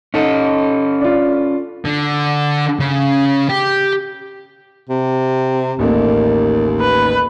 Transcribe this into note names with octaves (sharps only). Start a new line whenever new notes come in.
C#4 D#4 A4
D4 F4
D3
C#3
G4
C3
A1 D#2 A3 A#3
B4